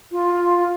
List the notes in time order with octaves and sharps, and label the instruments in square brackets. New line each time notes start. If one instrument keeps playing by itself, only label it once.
[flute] F4